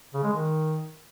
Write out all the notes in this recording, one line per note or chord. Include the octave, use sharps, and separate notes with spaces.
C#3
G#3
D#3